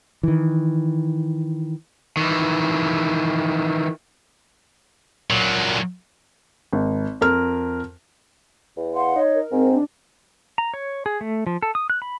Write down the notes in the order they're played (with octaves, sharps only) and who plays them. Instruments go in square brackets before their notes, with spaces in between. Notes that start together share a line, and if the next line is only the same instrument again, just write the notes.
[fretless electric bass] D#3 E3
[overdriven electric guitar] D#3 E3
[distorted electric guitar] A#2 F#3
[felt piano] G#1
F2 A#4 F6
[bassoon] E2
[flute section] F5 F#5 C6
[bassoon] D#4 [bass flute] C#5
[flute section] A#4
[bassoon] G#2 [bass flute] C4
[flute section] D4
[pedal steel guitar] A#5
C#5
G#4
A3
F3
A4
D#6
F#6
B5